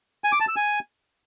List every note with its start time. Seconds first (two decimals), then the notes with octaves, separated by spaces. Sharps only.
0.24 G#5
0.32 D6
0.40 A5
0.48 E6
0.56 G#5